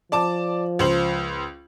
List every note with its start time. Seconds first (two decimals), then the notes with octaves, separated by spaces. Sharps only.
0.12 F3 D5 A5 D6
0.79 C#2 C5 F#7